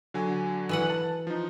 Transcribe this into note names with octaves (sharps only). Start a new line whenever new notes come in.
D3 F#3 G#5
E3 B4 F#5
A5
F3 D#4